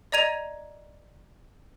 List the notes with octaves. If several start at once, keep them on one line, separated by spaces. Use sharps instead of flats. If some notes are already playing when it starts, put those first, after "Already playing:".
D5 D#5 A#5 G#6 D#7 F7